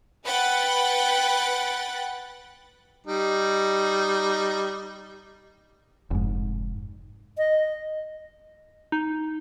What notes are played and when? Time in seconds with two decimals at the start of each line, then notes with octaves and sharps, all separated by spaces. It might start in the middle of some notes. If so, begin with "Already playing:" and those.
0.25 B4 F#5 G5 B5 F#6 A6
3.07 G3 D#4
6.11 F1 G#2
7.38 D#5
8.92 D#4